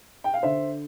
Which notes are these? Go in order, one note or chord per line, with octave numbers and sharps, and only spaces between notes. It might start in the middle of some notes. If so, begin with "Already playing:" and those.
G5
F5
D3 C5 E5